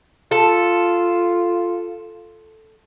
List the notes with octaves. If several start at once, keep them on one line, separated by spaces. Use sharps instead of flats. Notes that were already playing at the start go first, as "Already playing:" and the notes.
F4 A4